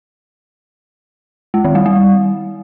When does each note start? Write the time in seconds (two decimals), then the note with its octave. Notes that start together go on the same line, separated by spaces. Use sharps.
1.54 G#3
1.64 D#3
1.75 G3
1.86 G3